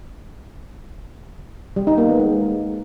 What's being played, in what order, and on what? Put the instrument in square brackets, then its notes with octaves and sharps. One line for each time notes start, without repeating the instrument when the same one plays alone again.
[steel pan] G3
D#4
A#3
B3
G#3